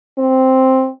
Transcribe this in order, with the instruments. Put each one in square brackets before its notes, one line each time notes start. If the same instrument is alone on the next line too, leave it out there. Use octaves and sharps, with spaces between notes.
[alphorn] C4